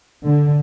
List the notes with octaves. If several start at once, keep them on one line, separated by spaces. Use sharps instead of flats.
D3